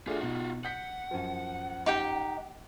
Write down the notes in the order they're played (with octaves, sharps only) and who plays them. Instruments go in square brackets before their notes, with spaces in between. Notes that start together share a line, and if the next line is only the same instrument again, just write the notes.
[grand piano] A3 D4 G#4 [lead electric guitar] F4 F#4
[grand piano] B2 D#4
[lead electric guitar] F#5 [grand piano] G6 B6 C#7
[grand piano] F#2 F3
[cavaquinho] D#4 G4 G5